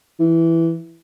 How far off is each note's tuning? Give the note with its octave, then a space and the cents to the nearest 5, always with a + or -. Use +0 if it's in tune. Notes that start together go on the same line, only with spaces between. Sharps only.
E3 +5